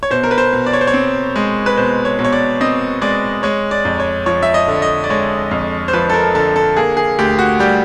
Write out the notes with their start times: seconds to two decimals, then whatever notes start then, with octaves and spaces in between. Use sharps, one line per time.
0.03 C#5
0.11 B2 C5
0.23 A#4
0.31 B4
0.38 C5
0.53 B2
0.66 D5
0.73 C#5
0.81 C5
0.87 C#5
0.94 C4
1.36 G#3
1.66 B4
1.77 B2 C5
2.05 C#5
2.19 B2
2.24 C#5
2.33 D5
2.61 C4 D#5
3.02 G#3 D5
3.43 G#3 C#5
3.71 D5
3.85 F2
4.00 C#5
4.26 F3 C#5
4.43 E5
4.54 D#5
4.68 D3
4.82 D#5
5.04 D5
5.10 G#3 C#5
5.51 F2
5.88 C5
5.93 F3 B4
6.09 A4
6.14 A#4
6.35 D3 A4
6.56 A4
6.76 A#3 G#4
6.97 G#4
7.19 D2 G4
7.39 F#4
7.60 G3 G4